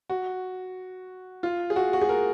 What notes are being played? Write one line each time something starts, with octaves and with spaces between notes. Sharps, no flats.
F#4
F4
G#4
F#4
F#4
G#4
A#4